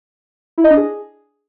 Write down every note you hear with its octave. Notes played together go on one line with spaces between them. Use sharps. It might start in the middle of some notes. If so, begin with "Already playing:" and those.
E4
D#5
D4
G#4